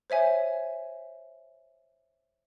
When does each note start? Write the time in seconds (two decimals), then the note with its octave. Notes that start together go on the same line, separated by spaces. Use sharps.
0.10 C5 C#5 E5 G#5